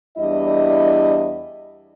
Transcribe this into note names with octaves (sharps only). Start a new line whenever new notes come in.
E2 G3 D4 E4 D#5